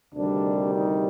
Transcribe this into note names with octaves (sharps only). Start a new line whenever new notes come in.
D2 C3 D#3 G3 D4
D#4